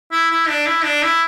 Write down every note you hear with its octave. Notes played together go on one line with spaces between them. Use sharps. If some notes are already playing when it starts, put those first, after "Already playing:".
E4
E4
D4
E4
D4
E4